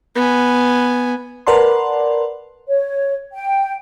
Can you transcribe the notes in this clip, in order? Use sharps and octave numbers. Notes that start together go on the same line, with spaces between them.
B3 G#5
A#4 B4 D5 F#5 A5 C6
C#5
G5